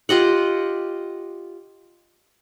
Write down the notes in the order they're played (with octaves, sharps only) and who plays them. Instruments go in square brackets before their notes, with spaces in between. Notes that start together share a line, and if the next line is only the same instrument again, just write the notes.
[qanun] F4 G4 D#5 F#5